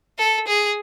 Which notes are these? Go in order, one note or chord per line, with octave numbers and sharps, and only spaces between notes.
A4
G#4